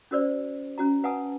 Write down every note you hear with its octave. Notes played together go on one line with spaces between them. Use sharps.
C#4 F#4 A#4 C5 D5
C#4 F#4 A#5
B4 F#5 G#5 A5 D#6